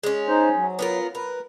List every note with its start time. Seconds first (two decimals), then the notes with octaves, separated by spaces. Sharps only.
0.03 G#3 C#4
0.28 D#4 C5
0.56 F#3
0.79 B3 F4 A#4
1.15 A#4 B4